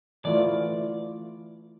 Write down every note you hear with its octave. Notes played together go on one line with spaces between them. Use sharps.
E3 A3 F4 D5